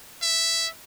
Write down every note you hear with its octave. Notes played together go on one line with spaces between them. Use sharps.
E5